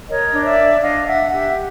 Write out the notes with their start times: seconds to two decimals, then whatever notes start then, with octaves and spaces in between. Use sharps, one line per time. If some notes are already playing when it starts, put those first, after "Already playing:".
0.09 A#4 C#5 D#5
0.33 D4
0.45 D5 E5
0.58 D4
0.82 D4 D#5 F5
1.06 D4 E5 F#5
1.30 G4 E5 F#5